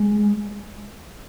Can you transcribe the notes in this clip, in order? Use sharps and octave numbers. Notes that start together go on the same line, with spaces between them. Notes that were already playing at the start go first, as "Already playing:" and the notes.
Already playing: G#3